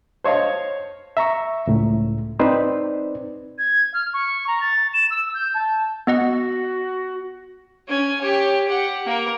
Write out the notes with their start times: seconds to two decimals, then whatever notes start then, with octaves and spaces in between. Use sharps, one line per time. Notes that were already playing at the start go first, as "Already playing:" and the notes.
0.24 C5 C#5 D#5 F5 A5
1.17 E5 A#5 C#6
1.67 C#2 A2
2.39 C4 D#4 B4 C5 D5
3.59 G#6
3.94 F6
4.14 C#6
4.48 A#5
4.61 A6
4.94 E7
5.10 E6
5.34 G6
5.55 A5
6.07 B3 F#4 D#5 F#5
7.88 C#4 G#5
8.21 G4 C#5
8.68 G4 F#5
9.06 A#3 A#4